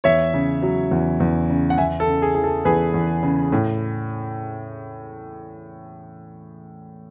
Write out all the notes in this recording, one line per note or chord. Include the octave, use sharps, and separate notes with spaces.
E2 C#5 E5
C#3
F#3
E2
E2
C#3
F#5
E2 E5 G#5
A4
C#3
G#4
E3 G#4
A4
E2 G#4 B4
E2
C#3
A2